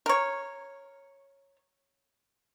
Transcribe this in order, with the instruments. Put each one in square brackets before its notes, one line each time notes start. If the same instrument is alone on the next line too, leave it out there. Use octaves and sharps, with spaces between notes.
[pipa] A#4 C#5